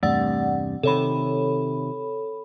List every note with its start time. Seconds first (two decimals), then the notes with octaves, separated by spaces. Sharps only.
0.03 E2 G2 C3 A3 D5 F#5
0.83 C3 D#3 A4 C#5 B5